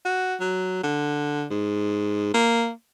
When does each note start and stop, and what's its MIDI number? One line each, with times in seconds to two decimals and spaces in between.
0.05 0.35 66
0.40 0.82 54
0.83 1.45 50
1.50 2.31 44
2.34 2.71 58